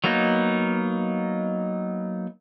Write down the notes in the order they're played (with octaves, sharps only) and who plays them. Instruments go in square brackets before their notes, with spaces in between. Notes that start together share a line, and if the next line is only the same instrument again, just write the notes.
[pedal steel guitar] F#3 A#3 B3 D#4